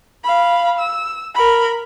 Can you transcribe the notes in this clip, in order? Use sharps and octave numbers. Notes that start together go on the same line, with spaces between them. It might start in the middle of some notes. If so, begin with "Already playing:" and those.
F5 B5
E6
A#4 B5